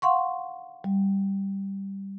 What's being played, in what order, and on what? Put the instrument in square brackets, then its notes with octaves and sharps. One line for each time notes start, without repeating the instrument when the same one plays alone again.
[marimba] F5 F#5 C6 C#6
G3